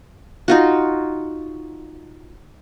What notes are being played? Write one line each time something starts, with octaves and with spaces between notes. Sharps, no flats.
D#4 F4 F#4